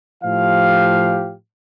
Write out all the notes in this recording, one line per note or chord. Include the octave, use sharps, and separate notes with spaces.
A2 F3 G4 F5